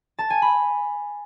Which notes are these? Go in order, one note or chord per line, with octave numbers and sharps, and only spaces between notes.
A5
G#5
B5